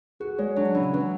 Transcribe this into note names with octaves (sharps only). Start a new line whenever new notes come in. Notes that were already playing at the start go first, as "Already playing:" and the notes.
F#4 G#4
G#3 C#5
F#3 D4
C#3 E3
F#3 B4